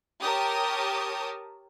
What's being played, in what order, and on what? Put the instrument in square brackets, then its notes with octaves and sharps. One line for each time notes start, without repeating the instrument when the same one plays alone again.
[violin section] G4 A#4 C#5 A5 D#6